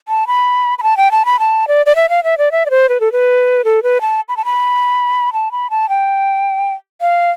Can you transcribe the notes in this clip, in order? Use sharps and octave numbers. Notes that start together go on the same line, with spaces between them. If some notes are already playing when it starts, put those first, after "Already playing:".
A5
B5
B5
A5
G5
A5
B5
A5
D5
D5
E5
F5
E5
D5
E5
D5
C5
B4
A4
B4
A4
B4
A5
B5
A5
B5
A5
B5
A5
G5
F5